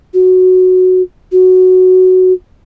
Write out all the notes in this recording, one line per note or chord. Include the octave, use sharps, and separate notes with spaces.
F#4
F#4